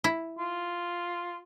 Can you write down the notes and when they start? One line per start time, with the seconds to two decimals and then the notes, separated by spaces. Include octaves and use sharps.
0.04 E4
0.38 F4